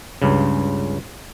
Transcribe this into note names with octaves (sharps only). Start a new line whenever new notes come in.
C#2 G2 C#3